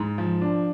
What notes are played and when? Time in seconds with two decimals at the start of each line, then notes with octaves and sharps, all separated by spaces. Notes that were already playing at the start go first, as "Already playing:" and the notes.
Already playing: G#2
0.18 F3
0.41 D4